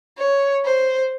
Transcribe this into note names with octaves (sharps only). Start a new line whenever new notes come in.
C#5
C5